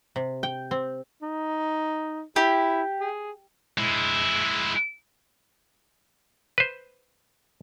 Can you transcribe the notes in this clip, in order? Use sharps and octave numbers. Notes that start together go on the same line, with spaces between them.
C3
G5
C4
D#4
E4 G4
G#4
G#3 E4
B4 C5